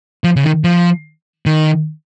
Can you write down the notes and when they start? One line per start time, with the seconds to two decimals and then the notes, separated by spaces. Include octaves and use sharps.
0.24 F3
0.36 C#3
0.44 D#3
0.64 F3
1.46 D#3